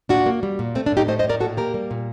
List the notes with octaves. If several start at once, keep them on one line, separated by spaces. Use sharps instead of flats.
A#2 D4 F#4
A#3
G3
A#2
A3 C4
D4
A2 D#4 G4
A3 C5 D#5
C5 D#5
A2
A#4 D5
A#2 F#4 A4
A#3 G4 A#4
G3
A#2